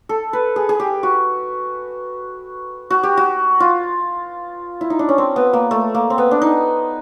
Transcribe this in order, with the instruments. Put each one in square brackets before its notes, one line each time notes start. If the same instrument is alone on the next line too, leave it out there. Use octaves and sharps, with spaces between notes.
[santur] A4
B4
G#4
G#4
G4
F#4
F#4
G4
F#4
F4
E4
D#4
D4
C#4
C4
B3
A#3
A3
A#3
C4
B3
D4
D#4